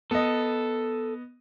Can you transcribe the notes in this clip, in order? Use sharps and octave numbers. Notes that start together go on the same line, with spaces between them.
B3 A4 D#5